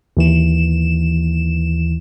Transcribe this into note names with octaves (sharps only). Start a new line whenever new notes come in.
D#2 E3 E7